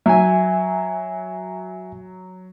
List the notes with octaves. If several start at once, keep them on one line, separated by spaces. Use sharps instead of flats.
F#3 E5 G#5